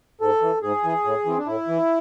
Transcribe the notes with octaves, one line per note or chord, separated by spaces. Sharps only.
G#2 A4
E3
G#2 G#4
E3
A2
E3 C4
D4
A2 E4
E3